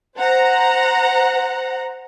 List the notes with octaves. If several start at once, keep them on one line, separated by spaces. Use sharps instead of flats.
C5 F#5 A#5